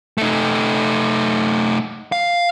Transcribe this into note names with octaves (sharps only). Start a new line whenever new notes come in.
A3 D#4
F5